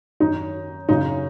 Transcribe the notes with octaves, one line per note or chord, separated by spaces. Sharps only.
F#2 D#3 D#4
F#2 C#3 D#4